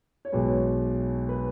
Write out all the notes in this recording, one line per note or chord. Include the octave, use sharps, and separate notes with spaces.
C#5
B1 B2 G#3 B4
B4